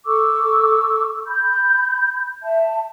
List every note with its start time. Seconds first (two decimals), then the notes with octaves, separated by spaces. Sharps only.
0.06 A4 C#6 D6 E6
1.27 B5 G6
2.43 E5 A5